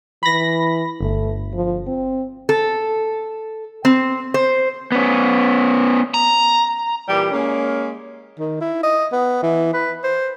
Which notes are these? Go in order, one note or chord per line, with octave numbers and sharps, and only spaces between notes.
E3 B5 A#6
G1 A3
F3
C4
A4
C4
C5
B3 C#4
A#5
A#2 E3 G3 G4
G#3 A#3 C#4
D#3
E4
D#5
B3
E3
B4
C5